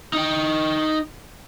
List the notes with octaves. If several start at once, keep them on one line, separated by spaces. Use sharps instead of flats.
D#4 G5